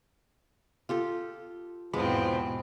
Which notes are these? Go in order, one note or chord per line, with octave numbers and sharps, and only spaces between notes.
F4 G4 A4
E2 G#2 B2 F3 G#3 B3 C4 B5